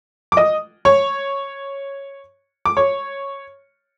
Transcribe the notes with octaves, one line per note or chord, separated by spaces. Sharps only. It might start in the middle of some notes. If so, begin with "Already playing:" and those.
D6
D#5 D#6
C#5 C#6
D6
C#5 C#6